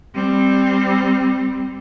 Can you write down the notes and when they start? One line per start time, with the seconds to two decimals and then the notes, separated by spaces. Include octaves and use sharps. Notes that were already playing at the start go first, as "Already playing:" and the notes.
0.15 G3 C4